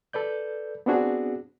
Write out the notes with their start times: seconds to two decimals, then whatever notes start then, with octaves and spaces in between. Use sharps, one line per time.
0.13 A4 B4 D5 G6
0.86 B3 C4 D4 F#4 G#4